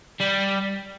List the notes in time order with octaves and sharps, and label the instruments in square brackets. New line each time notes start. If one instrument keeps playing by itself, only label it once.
[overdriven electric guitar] G3